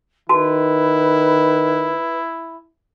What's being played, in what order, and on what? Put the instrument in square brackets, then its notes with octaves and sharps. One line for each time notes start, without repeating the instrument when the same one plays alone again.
[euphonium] D#3 [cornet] E4 [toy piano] F#4 A5 [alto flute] B4